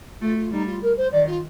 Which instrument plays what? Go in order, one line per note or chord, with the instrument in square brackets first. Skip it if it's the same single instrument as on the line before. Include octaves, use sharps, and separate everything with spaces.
[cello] A3 [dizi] F4
[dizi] F4
[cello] G3 [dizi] D#4
[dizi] F4
A#4
C5
[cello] D#3 [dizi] D5
[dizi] F4